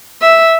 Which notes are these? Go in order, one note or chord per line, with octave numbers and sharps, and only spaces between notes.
E5